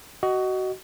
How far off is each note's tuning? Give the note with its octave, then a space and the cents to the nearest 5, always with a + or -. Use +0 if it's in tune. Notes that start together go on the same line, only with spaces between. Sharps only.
F#4 +25 D#5 +0